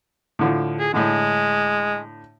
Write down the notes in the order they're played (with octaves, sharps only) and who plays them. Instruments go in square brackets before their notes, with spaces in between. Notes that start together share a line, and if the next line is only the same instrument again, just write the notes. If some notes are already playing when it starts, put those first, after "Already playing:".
[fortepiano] A2 D3 F3
[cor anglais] G#4
[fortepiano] A2 D3 [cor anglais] G#3